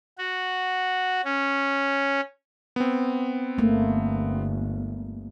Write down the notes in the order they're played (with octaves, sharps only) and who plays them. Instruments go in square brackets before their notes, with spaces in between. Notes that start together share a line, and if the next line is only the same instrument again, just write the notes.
[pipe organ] F#4
C#4
[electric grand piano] B3 C4
[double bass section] G1 [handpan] A3 A#3